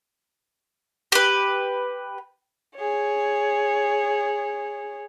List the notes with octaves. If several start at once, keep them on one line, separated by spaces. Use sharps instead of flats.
G4 B4
G#4 C#5